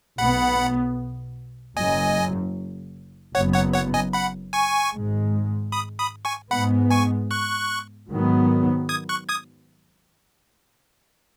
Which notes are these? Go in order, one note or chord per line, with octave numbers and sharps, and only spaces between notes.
B1 B2 B3 F#5 B5
F#1 F#2 F#3 D#5 G#5
F#1 F#2 F#3 B3 C#5 F#5
C#5 F#5
C#5 F#5
D#5 G#5
F#5 B5
G#5 C#6
G#1 G#2 G#3
B5 D#6
B5 D#6
G#5 C#6
G#2 G#3 B3 F#5 B5
G#5 C#6
C#6 F#6
G#2 D#3 F#3 B3
D#6 G#6
C#6 F#6
D#6 G#6